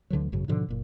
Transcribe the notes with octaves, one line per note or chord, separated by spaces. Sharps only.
D2 D3 E3 F#3
G#1 F#2 C#3
G#2 B2 D3 F3
F#1 A#2